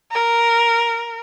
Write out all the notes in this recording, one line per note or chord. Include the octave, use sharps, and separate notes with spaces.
A#4